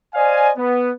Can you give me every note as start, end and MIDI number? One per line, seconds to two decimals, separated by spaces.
0.15 0.51 72
0.15 0.51 74
0.15 0.51 75
0.15 0.51 77
0.15 0.51 80
0.57 0.91 59